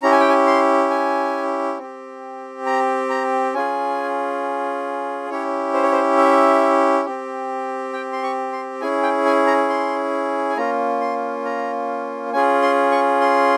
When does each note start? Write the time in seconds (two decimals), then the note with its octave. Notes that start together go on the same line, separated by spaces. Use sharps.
0.02 C#4 E4 G4 A#5
0.12 G#5
0.20 G5
0.29 G#5
0.47 C6
0.90 G#5
1.78 C4 G4
2.66 A#5
3.10 A#5
3.54 C#4 F4 G#4 G#5
5.30 C#4 E4 G4 C#5
5.74 C5
5.83 C#5
5.92 C5
6.17 E5
7.06 C4 G4
7.93 G5
8.13 C6
8.23 C#6
8.52 C6
8.81 C#4 E4 G#4 G#5
9.03 G5
9.25 G#5
9.47 A#5
9.69 C6
10.50 G#5
10.57 A#3 C#4 F4 A#5
11.01 C6
11.45 A#5
12.33 C#4 F4 G#4 G#5
12.62 C6
12.91 C#6
13.21 C6